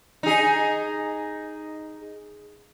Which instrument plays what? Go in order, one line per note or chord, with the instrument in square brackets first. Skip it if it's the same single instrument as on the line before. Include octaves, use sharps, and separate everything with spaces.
[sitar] D#4 G#4